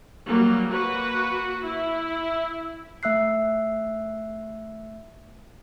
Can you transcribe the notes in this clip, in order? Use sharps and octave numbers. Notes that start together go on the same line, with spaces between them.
F#3 G3 A#3
A#3 F#4 B4
E4
A3 E5 E6 F#6 C7